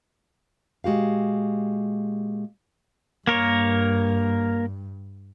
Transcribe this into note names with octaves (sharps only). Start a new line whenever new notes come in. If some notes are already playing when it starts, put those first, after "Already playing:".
A#2 G#3 F#4 G4 F5
G2 A#3 A#4 C#5